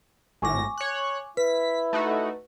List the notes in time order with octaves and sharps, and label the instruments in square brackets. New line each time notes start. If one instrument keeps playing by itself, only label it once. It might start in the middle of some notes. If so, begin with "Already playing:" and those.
[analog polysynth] G#1 A2 A#6 [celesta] G#5 C#6 D6
[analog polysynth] C#5 F#6
[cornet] E4 [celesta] B4 [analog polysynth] B6
[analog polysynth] A3 D#4 F#4